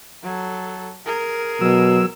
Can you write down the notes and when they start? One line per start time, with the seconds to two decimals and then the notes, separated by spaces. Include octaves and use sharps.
0.23 F#3 A4
1.06 G#4 A#4
1.61 B2 F#3 E6